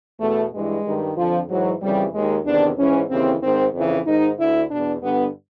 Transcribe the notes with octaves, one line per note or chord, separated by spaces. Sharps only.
E2 B2 A3
G2 E3 G#3
G2 D#3
F2 D3 F3
G#2 E3 F#3
F2 C#3 E3 G3
D#2 D#3 G#3
E2 C3 D#3 D4
G#2 E3 C#4
D#2 C#3 E3 C4
G#2 D#3 C4
F2 C#3 E3
G#2 D#3 D#4
D2 D3 E4
E2 B2 D4
G2 D3 B3